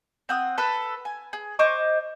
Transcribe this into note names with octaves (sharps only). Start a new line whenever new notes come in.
C4 F#5 D#6
A4 B4 E6 F#6
G#5
G#4
C5 D#5 C#6 D6